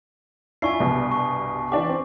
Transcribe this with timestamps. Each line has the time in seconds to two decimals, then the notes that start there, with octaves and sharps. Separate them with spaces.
0.62 D4 E4 F4 G#5 C#6 C7
0.80 C2 G2 B2
1.11 C#6
1.72 E3 D4 G4 D6
1.89 C4